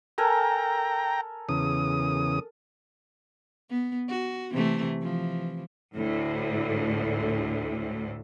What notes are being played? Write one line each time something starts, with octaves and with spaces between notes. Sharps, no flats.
A4 A#4 G5 G#5 A#5
E2 C#3 D#6
B3
F#4
C3 E3 A3
E3 F3
D2 A2